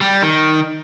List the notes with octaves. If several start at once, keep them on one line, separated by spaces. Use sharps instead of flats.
G3
D#3